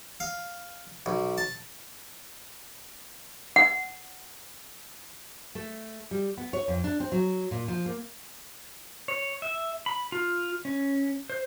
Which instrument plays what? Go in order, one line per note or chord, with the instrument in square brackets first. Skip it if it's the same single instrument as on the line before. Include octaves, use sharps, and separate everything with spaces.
[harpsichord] F5
B1
A5
[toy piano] F#5
[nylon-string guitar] A3
G3
B3
C#5
F2
D4
C4
F#3
A#2
F3
A#3
[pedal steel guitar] C#5
E5
B5
F4
C#4
C5